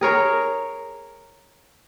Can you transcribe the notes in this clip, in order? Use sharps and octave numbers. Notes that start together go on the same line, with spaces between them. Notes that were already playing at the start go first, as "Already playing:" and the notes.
G#4 A#4 C#5